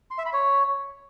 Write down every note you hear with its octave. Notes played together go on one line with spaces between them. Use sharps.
C6
E5
B5
C#5